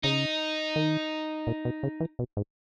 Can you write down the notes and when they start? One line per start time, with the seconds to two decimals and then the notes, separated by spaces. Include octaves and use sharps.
0.03 C#3 D#4
0.76 D#3
1.47 A#2
1.65 B2
1.83 C#3
2.00 E3
2.19 B2
2.37 G#2